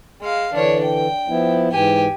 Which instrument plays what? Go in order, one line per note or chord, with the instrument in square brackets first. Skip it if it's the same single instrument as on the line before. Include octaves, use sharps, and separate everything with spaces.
[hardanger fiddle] G#3 F5
[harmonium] D3 E3 [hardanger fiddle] D4 C#5
[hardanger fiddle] G5
[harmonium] F3 B3 E4
[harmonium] G#2 E3 [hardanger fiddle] G4 G#5